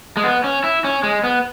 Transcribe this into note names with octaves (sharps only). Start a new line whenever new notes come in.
G#3
B3
C#4
E4
C#4
G#3
B3